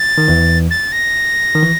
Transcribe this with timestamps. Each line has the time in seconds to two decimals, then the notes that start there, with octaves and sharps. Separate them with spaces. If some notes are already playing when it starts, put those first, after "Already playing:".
Already playing: A6
0.18 D#3
0.28 E2 E3
0.71 A6
0.92 A#6
1.55 D#3
1.63 E3